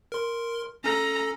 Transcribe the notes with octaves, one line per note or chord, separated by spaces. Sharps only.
A#4 C6
C#4 A4 A#5